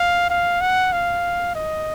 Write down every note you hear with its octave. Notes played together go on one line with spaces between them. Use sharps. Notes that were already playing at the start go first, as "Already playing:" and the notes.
Already playing: F5
F5
F#5
F5
D#5